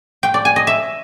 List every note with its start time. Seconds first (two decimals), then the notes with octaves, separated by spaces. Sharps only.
0.23 G5
0.34 D5
0.45 G#5
0.56 D#5
0.67 E5